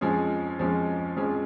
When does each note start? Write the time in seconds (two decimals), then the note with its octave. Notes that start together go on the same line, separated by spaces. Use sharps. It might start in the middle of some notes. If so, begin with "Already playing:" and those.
0.01 F2 F3 G#3 C#4 G#4
0.59 F2 F3 G#3 C#4 G#4
1.17 F2 F3 G#3 C#4 G#4